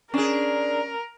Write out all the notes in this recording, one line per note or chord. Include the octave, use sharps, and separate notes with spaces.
C#4 D4 G#4 A#4